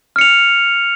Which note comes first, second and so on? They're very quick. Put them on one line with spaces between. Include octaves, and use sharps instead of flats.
F6 C#7 F7